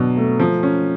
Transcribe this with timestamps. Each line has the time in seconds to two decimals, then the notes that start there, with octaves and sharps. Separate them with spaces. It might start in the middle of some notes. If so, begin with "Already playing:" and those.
Already playing: B2 F#3 D4
0.17 A3
0.39 F3
0.63 C#4